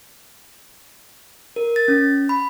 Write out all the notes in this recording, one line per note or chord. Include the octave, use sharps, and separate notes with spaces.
A#4
A6
C#4
B5